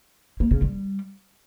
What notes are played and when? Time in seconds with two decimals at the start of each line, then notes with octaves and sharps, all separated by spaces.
0.40 A#3
0.51 C#3
0.62 G3